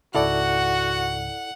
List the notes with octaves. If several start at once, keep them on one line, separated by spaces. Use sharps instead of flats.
C#2 G#2 C#3 E4 F#4 A4 D5 F#5